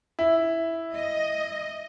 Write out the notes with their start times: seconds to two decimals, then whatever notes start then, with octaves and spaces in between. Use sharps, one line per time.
0.19 E4
0.96 D#5